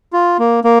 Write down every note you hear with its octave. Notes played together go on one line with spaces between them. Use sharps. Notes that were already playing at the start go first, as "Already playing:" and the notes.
F4
A#3
A#3